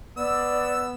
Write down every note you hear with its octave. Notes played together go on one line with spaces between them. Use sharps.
B3 D5 E6